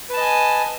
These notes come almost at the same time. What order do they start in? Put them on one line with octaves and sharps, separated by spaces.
B4 A5 D#5 G#5